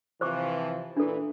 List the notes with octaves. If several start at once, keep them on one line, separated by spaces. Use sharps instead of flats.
C3 E3 F3 C5 C#6 D6
A#2 E3 D4 A4